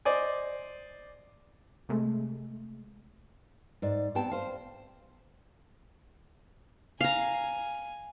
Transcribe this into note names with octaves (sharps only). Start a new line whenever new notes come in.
C5 D5 D#5 G#5
C3 G#3 A3
G#2 D5
B3 C4 G4 G5 A5
C5 F5
F5 G#5 A#5